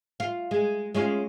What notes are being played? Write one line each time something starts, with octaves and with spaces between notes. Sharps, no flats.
F4
G#3
G#3 C#4 F4